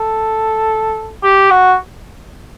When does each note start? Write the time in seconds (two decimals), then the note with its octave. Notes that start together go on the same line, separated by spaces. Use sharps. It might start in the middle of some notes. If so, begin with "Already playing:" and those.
Already playing: A4
1.23 G4
1.50 F#4